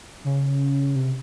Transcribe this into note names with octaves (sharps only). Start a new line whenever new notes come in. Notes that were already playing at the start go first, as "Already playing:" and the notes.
C#3
C3